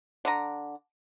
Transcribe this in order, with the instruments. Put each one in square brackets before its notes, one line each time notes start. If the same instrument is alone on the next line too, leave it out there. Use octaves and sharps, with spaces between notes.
[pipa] D3 A#5